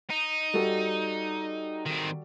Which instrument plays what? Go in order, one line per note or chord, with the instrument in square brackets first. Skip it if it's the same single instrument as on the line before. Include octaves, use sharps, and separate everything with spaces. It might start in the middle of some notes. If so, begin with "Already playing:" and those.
[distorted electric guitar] D#4
[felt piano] G3 F#4 A4
[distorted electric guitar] D#3 C4